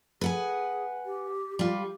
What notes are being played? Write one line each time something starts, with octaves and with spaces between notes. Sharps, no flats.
G#4 B4 F#5 G#5
G4
G3 F4 G4